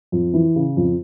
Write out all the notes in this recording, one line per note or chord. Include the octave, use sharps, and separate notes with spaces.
F2
E3
C#3
F2